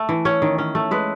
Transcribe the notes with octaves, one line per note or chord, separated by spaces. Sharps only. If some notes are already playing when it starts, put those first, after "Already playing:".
Already playing: A3
E3
C#4 C#5
D#3
C#4
A3
G#3 B4